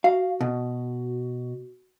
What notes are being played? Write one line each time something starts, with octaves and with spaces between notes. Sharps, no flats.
F#4 F5
B2